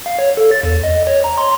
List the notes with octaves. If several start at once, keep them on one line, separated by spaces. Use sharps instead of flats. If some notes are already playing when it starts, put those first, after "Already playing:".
F5
C#5
A4
A6
E2
D#5
C#5
A#5
C6